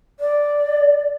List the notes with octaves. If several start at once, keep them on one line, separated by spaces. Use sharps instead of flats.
D5